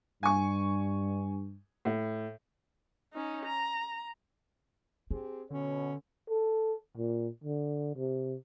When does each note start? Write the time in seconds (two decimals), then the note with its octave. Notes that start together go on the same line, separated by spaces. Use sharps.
0.23 G2 G#5 C#6
1.85 A2
3.14 C#4 D#4
3.46 A#5
5.11 C4 D4 G4 G#4
5.50 B2 D3 C#4 C#5
6.29 A4
6.97 A#2
7.44 D3
7.96 C3